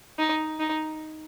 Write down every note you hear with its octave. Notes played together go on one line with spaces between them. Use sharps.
D#4
D#4